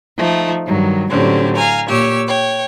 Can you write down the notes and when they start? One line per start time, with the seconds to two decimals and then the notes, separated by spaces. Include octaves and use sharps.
0.17 F3 A3 D#4
0.66 G2 D#3 F#3
1.10 A2 D3 F#3 G3 C4 C#4
1.55 F5 G#5 A#5
1.88 A#2 G4 C#5 E6
2.26 C#5 G5